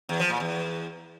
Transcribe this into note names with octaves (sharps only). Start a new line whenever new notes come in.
E2
F3
A#2
E2